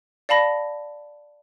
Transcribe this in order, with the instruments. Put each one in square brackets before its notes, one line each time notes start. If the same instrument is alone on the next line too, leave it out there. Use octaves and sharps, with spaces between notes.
[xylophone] D5 F5 A5 B5 A#6